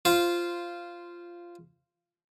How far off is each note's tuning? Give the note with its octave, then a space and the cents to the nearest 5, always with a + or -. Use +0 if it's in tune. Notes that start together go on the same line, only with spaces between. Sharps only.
F4 -10 C5 +0